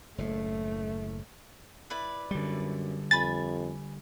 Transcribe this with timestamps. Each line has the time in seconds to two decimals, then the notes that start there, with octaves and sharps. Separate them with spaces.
0.18 F#1 A2 A3
1.90 E4 B4 D5
2.31 F#2 D3 G3
3.11 F2 G#5 B5 A6